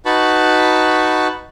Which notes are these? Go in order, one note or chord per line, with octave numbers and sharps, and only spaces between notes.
D#4 F#4 B4 A5 B5 C#6